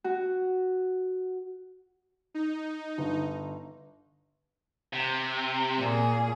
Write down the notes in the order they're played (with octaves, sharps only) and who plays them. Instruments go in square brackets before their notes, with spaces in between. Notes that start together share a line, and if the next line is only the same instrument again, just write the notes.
[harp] F#4
[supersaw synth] D#4
[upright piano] G1
[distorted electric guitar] C3
[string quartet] A#2 G#4